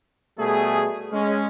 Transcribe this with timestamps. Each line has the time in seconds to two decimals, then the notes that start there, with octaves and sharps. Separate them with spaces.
0.39 B2 G3 A3 G#4
1.13 G#3 C#4